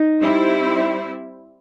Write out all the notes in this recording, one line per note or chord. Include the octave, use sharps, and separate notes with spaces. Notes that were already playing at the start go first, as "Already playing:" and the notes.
Already playing: D#4
G3 C4 E4